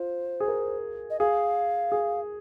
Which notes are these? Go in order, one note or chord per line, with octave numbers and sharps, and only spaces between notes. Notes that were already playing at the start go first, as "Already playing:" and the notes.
Already playing: F4 C5
G#4
A#4
D#5
G#4 F5
G#4